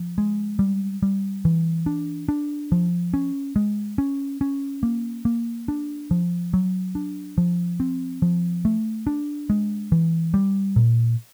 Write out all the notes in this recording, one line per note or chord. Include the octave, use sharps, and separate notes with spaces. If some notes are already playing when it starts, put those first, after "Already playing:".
Already playing: F3
G#3
G3
G3
E3
D4
D4
F3
C#4
G#3
C#4
C#4
A#3
A#3
D4
F3
F#3
D4
F3
C4
F3
A3
D4
G#3
E3
G3
A#2